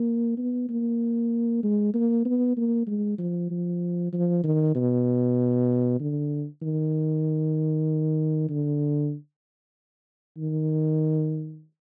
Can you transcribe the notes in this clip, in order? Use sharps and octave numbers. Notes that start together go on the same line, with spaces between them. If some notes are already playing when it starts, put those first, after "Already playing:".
Already playing: A#3
B3
A#3
G#3
A#3
B3
A#3
G#3
F3
F3
F3
D#3
B2
D3
D#3
D3
D#3